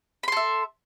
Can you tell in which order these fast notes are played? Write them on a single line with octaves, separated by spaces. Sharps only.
B5 C6 A4 E5